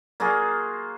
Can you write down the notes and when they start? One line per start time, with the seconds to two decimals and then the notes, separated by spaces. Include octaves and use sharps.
0.20 A#3 F4 F#4 G#4